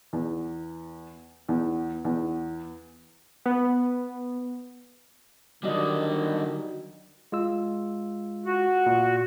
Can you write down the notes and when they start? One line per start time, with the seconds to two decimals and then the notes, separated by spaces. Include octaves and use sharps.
0.13 E2
1.49 E2
2.05 E2
3.46 B3
5.63 D3 D#3 F#3 G3 D4 D#5
7.32 G#3 F4 E6
8.46 F#4
8.86 A#2